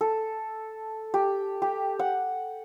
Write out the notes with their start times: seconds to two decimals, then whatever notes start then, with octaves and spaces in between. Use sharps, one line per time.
0.01 A4
1.14 G4
1.62 G4
1.99 F#5